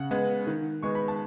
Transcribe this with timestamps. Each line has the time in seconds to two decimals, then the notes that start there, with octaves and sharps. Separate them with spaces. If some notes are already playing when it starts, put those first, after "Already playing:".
Already playing: C#3 F#5
0.11 G#3 B3
0.47 D#3
0.83 G#3 B3 C#6
0.95 B5
1.08 A5